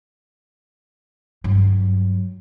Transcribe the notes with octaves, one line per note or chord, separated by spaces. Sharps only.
G2 F#3